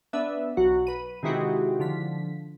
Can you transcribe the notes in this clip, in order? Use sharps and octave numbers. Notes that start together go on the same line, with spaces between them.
B3 D4 E5
B1 F#3 F#4
B4 D#7
C3 D#3 G#3 E4 F#4 G4
D3 F3 B6